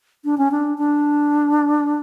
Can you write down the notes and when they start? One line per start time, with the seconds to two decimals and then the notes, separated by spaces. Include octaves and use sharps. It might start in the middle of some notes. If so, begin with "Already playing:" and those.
0.25 D4
0.38 C#4
0.51 D4
0.78 D4